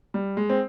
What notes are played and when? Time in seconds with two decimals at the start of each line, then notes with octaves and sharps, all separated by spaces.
0.14 G3
0.37 G#3
0.50 C4